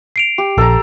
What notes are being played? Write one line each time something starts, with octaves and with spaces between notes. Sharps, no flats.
C7 D7 F7
G4
A#1 A4 A#5